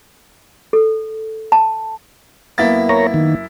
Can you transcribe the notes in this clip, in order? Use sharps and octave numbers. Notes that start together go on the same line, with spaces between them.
A4
A5
F#2 A#3 B3 E4 A6
A#4 C#5 A#5
D#3